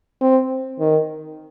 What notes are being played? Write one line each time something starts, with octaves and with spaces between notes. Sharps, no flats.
C4
D#3